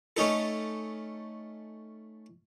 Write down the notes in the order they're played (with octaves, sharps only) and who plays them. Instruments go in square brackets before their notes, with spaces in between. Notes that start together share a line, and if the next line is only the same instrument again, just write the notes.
[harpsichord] A3 C#4 D#4 A4